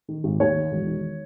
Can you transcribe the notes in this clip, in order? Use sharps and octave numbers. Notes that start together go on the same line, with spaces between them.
D#3
G#1
D#2 C#5
D#3
E1
D#3